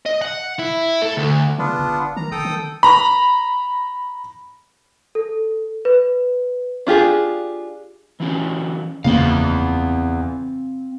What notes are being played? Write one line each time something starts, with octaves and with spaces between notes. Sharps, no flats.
D#5
F#5
E4
A4
D2
C#3 B3 D4 F4
G1
D#3 A#5
E1 A4 G5 D#6
D#3
A#5 B5
A4
B4
D4 F4 G4 G#4
E3 F#3 C#4
F#1 E2 C#3 A#3 C4 F5